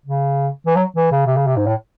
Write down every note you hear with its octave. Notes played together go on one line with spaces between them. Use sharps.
C#3
E3
F#3
E3
C#3
C3
C#3
C3
G#2
A2